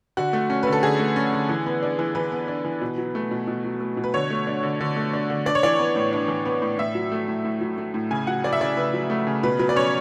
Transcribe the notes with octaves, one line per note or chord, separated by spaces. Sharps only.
D3 F#4
A3
C#4
D3 B4
A4
D3 G#4
A3
C#4
D3
E3
B3
D4
E3
E3 B4
B3
D4
E3
B2
F#3
A3
B2
B2
F#3
A3
B2
B4
D3 C#5
A3
D4
D3
D3
A3
D4
D3
D4 D5
C#5
E3 D5
B3
A2
D4
E3
B3
A2
A2 E5
F#3
A3
A2
A2
F#3
A3
A2
C#3 G#5
F#3 F#5
A3 D5
E5
C#3 D5
C#3 B4
F#3
A3
C#3
B2 B4
F#3 B4
D5
C#4 C#5